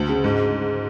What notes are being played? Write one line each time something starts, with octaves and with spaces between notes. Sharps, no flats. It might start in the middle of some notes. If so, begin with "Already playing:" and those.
Already playing: D2
C#3
G#2